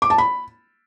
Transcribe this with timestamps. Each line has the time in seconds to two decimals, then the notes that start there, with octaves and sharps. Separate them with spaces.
0.02 D6
0.10 A5
0.18 B5